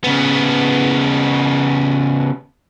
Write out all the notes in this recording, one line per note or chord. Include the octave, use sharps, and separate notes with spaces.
C#3 B3